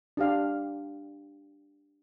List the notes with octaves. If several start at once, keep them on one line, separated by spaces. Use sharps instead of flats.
D4 G4 F5